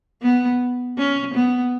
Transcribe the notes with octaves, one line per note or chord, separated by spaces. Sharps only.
B3
C#4
B3